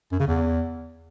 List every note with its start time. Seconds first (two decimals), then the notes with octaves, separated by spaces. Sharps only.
0.12 F#2
0.20 C#3
0.27 E2